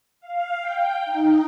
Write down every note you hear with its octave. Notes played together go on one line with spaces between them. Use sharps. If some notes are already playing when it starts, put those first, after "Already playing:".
F5
G5
D#4